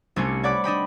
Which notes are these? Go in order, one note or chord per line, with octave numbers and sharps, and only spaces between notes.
C2 A3 C#4 D4 C#7
C#5 D5 F#5 B5 D6
D4 D#5 G5 B5